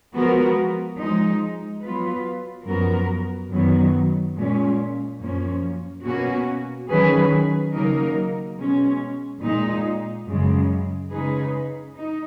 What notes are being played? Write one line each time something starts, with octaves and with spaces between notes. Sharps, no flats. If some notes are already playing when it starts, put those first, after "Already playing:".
F3 G#3 B3 F#4 A#4
F3 G#3 D#4
F#3 B3 F4 B4
F#2 F3 B3 F#4 A#4
F#2 D#3 F#3 B3
A#2 G#3 C#4
F#2 F3 A#3 C#4
B2 A#3 C#4 F#4
D#3 F#3 C#4 G#4 B4
C#3 F#3 A#3 D#4 A#4
B2 G#3 C#4
A#2 G#3 D#4
F#2 C#3 G#3
C#3 G#3 D#4 G#4 B4
D#4